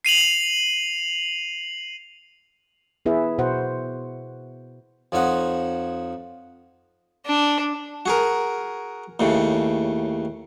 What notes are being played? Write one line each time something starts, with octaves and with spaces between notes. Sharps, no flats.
C7 D#7 F7 F#7
B3 E4 G#4 B4 E5
B2 F#4 C5 F#5
F2 F3 D#4 C#5 F#5 D#6
D4
F#4 G#4 A#4
D#2 A2 C#3